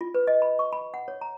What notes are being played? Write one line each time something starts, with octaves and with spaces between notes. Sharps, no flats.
F4
B4
D#5
B5
C#6
B5
F#5
C#5
A#5